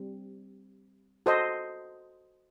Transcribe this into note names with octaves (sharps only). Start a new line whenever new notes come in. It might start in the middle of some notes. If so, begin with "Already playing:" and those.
Already playing: G3 C4
F#4 A4 C5 D#5